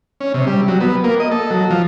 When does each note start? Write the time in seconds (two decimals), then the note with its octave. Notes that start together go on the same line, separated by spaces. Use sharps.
0.21 C#4
0.34 C3
0.47 G3
0.68 F#3
0.81 B3
1.04 A#3
1.20 D#5
1.32 A4
1.51 F#3
1.70 F3